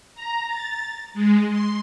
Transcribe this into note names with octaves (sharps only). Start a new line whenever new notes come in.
A#5
A6
G#3
C6